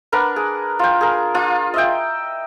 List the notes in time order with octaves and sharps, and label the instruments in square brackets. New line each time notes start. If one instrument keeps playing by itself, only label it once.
[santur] D4 A#4 B4 F#5
G#4
F4 G5
G#4 A#4
D4 F4
D#5 E5 G5